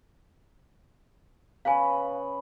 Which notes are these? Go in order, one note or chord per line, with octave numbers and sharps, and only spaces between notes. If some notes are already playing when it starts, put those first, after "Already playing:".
C#3 B4 F5 G#5 B5